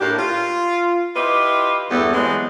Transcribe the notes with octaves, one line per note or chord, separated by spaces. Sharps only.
A2 A#3 D4 G4
F4
E4 F4 G4 B4 D#5
E2 G2 A3 B3 G4
E3 F#3 G#3 B3 C4